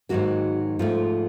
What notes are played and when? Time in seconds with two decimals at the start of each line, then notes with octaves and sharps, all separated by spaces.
0.09 G#2 D#3 F#3 A#3 F#4
0.79 G#2 F3 A3 F4